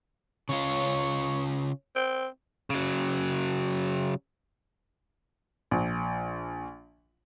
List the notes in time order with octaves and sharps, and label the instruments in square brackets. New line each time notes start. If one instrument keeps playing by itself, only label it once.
[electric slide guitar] C#3 C#4 F4 [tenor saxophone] C#5
[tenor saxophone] C4
[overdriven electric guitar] C#3 F#3
[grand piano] A#1